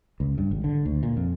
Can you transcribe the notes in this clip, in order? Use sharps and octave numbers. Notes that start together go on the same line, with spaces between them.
C#2
G2
G#1
D3
D2
A#2
F2